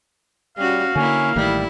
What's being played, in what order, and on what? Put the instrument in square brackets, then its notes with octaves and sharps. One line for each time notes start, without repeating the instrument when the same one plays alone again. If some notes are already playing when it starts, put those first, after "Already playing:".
[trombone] G3 [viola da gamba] C#4 F#4 [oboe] F5
[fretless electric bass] D3 [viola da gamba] A#3 E4 [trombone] C#4
[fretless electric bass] A1 D#3 A3 [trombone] G3 [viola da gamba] E4